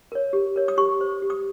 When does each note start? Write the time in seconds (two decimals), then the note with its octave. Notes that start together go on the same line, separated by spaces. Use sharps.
0.12 A#4 C#5
0.33 G4
0.56 A#4 C#5
0.68 D#6
0.77 G4 C#6
1.01 C5
1.22 G4
1.30 D#6